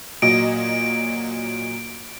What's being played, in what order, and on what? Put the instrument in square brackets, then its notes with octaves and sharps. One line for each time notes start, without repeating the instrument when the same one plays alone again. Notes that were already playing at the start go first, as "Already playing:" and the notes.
[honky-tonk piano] A#2 F#3 D#5 [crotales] D7